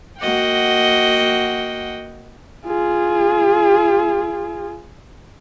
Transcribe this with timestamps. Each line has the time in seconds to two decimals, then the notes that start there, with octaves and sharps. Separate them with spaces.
0.19 A#3 F#4 D#5 F#5 G5
2.66 F4 G#4